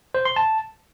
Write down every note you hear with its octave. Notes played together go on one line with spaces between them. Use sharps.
C5
C6
A5